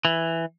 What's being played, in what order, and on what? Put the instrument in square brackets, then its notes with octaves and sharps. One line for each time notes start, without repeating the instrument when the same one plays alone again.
[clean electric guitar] E3